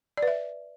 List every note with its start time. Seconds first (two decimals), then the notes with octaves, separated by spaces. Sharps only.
0.17 D5
0.22 B4
0.28 E5